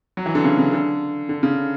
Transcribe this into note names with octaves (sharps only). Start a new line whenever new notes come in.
F#3
E3
D3
C#3
C#3
D3
D3
C#3